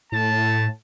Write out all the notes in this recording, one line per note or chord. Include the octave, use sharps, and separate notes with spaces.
A2 A5